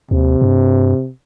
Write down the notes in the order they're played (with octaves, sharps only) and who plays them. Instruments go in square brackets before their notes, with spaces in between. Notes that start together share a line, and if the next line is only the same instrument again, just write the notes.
[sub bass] D#2 [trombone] C3
[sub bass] G2